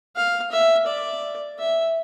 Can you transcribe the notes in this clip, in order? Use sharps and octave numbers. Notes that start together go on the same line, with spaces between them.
F5
E5
D5
E5